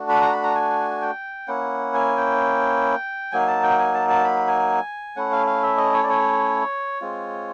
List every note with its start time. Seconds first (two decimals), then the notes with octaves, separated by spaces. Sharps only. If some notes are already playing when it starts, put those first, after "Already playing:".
Already playing: A3 D4 F#4
0.09 B5
0.21 A#5
0.32 B5
0.43 A#5
0.55 G#5
1.02 G5
1.47 A#3 C#4 E4 F#5
1.94 G#5
2.17 G5
3.32 F#3 A#3 D#4 G#5
3.48 A5
3.63 G5
3.79 G#5
3.94 A5
4.09 A5
4.25 B5
4.47 G#5
5.16 A3 C#4 E4 F#5
5.32 F5
5.47 F5
5.63 E5
5.77 D#5
5.93 C#5
6.03 D5
6.09 C#5
7.01 G#3 C4 F4